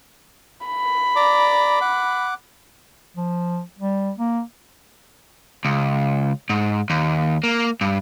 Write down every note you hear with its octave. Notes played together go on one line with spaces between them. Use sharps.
B5
D5 A#5 D6
F#5 D6
F3
G3
A#3
C#2
G#2
D#2
A#3
G2